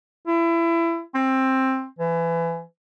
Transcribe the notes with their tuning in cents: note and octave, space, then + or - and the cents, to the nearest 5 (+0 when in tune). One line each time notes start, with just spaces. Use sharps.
E4 +25
C4 +15
E3 +25